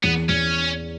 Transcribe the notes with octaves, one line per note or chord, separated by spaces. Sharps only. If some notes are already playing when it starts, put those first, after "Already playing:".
E2 B3
E2 C#4